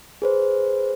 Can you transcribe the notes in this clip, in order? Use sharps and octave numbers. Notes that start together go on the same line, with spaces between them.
G#4 B4 C5